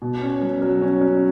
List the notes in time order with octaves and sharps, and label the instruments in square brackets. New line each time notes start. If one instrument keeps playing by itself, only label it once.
[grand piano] B2
C#4
F#3
F#3
C#4
F#3